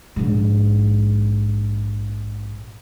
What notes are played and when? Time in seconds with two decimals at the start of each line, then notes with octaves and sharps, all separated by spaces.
0.16 A#1 G#2